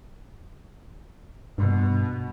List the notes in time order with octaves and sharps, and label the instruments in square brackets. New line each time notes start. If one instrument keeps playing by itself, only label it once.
[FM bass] G2 [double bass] B2